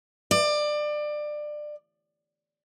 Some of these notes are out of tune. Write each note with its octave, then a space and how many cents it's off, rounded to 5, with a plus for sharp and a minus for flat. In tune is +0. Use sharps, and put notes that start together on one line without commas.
D5 +25